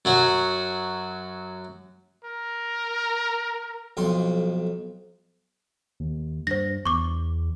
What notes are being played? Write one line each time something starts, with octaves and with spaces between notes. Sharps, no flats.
F#2 F#3 F#4
A#4
B1 F2 C6
D#2
G2 C5 A#6
E2 C#6 D6